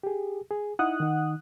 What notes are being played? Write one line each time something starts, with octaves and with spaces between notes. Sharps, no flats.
G4 G#4
G#4
D#4 E4 F#5 D#6 F#6
D#3 D#4